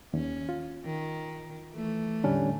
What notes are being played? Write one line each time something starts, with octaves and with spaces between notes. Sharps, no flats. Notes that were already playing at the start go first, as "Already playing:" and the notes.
D#2 C#4
F4
D#3
E3 A3
E2 A2 D3 G3 C#4 D4